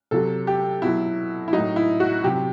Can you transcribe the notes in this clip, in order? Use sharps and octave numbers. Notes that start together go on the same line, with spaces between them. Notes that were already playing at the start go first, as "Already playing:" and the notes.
C3 F#3 A4
G4
B2 F#3 E4
E4
A2 F#3 D#4
E4
F#4
C3 F#3 G4